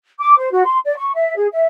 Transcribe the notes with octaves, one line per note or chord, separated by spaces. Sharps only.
D6
C5
F#4
C6
D5
C#6
E5
G#4
E5